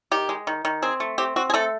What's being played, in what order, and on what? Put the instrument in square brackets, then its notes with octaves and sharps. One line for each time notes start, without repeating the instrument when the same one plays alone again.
[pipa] D#3 G4
G#3
D#3
D#3
C4 G#4
A3
C4 G4
C4 F#4
G#4
A3 A4